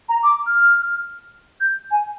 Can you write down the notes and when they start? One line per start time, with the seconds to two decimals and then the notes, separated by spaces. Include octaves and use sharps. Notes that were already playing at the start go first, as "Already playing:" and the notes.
0.09 A#5
0.23 D6
0.47 F6
1.61 G6
1.91 G#5